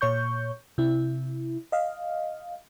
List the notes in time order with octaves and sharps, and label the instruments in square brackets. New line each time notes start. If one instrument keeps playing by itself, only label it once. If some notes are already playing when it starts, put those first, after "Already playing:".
[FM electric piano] A#2 C#5 C#6 G6
C3 E4
D#5 F5